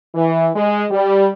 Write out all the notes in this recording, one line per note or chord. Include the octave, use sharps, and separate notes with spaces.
E3
G#3
G3